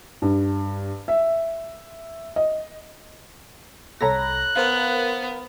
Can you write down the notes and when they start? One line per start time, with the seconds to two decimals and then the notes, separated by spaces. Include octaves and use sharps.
0.22 G2
1.08 E5
2.36 D#5
4.01 C2 A4 C#5 A#5 B5 F#6 A#6
4.56 B3 A#4 C5 F5